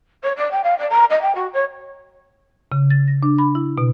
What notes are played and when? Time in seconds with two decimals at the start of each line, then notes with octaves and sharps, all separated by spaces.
0.23 C#5
0.36 D5
0.51 G5
0.63 F5
0.78 D5
0.90 A#5
1.10 D#5
1.21 G5
1.35 F#4
1.53 C#5
2.72 C#3
2.90 A6
3.08 A#6
3.23 D4
3.38 B5
3.55 E4
3.78 B2